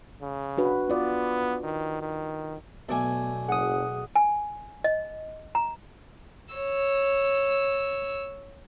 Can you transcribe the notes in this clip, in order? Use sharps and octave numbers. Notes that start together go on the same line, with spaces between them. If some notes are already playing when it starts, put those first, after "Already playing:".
C#3
D4 F#4 B4
B3 F4 D5
D#3
D#3
B1 A3 B3 A4 D5 G#5
F#1 G#4 F#5 D#6
G#5
D#5
A#5
C#5 E6